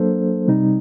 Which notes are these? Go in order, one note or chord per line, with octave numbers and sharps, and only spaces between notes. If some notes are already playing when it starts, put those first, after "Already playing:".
Already playing: F#3 A#3 D4 A4 C5
C3 G3 C4 D#4